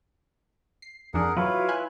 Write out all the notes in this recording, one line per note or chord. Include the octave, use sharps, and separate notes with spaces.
C7
F2 D4 G#4 A#4 F#5
F#3 E4 F4 B4 C#5 F5
G#5 B5 F#6